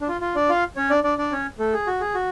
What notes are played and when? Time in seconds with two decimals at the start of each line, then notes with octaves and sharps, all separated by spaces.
0.01 D4
0.08 F4
0.21 F4
0.35 D4 D5
0.49 F4 F5
0.76 C#4 C#5
0.90 D4 D5
1.04 D4 D5
1.18 D4 D5
1.32 C#4 C#5
1.59 A3 A4
1.73 G#4
1.87 F#4
2.01 G#4
2.15 F#4